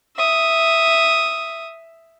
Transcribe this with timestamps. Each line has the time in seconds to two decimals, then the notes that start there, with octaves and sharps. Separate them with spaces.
0.16 E5 D#6